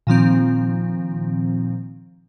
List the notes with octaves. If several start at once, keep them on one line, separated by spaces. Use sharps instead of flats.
A#2 D#3 F3 C4